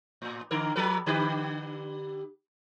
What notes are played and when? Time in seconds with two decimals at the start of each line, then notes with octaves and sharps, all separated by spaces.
0.22 A2
0.51 D3 A#4
0.76 F3 A4 B4
1.06 D3 G4 B4